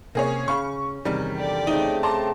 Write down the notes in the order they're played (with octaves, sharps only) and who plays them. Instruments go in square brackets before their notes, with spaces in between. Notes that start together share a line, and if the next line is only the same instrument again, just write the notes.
[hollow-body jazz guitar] C3 [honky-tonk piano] A#3 G#4 C#5 [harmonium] C#4
[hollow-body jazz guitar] C#3 F5 B5 [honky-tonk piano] C#6
[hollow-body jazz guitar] E2 C3 D#3 [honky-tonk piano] G3
[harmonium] D3 [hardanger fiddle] G4 D5
[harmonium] C#3 A3 C4 [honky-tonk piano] D#4
[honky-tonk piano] A5 C6 D6 [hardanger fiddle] A#5